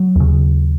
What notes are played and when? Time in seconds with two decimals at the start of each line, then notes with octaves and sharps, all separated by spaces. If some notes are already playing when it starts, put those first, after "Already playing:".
Already playing: F#3
0.16 D#2 C#3